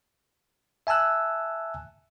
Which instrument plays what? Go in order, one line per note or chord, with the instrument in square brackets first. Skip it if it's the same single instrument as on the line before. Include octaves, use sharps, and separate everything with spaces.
[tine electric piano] E5 G#5 A5 E6 F#6